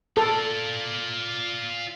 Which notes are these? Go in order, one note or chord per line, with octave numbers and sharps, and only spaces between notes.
F4 A4 D5